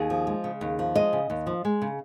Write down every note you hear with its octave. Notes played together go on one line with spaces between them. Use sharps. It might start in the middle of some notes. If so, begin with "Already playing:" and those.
Already playing: D#2 G#4
F3
G#3
C#3
D#2
F3
G#3 D#5
C#3
D#2
F3
G#3
C#3